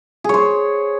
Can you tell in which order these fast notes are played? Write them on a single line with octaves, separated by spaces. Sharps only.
G#4 C#5 C5